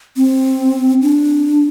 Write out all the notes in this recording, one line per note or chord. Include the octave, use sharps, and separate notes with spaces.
C4
D4